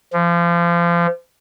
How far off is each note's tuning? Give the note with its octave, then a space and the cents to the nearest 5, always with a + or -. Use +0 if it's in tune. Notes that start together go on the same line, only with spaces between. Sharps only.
F3 -30